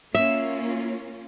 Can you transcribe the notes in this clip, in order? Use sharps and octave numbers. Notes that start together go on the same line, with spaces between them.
A#3 C#4 F4 E5